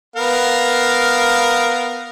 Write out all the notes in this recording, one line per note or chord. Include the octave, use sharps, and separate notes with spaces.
B3 A#4 F5